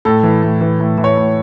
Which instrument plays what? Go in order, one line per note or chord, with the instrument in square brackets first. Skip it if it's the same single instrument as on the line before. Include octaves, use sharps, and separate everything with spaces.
[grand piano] A2 A4
E3
A2
E3
A2
E3
C#5
A2